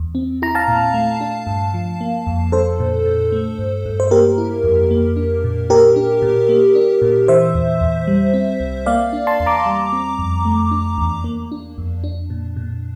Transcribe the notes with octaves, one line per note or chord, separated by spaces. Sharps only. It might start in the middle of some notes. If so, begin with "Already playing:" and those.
Already playing: E2
C4
E4 A#5
F5 A5
A#2
A3
D4
G2
F3
A#3
F2
D4 A4 C5
A#2
A#2
A3
G2
G2
C5
A#3 G4 A#4
E4
F2
A#3
D4
A#2
A#3 G4 A#4
D4
A#2
A#3
D4
A#2
E3 C5 E5
E2
E2
G3
C4
C2
A#3 D5 F5
D4
A5 C6
E2
A#5 D6
G3
C4
F2
A3
D4
E2
A#3
D4
F2
D4
A#2
A#2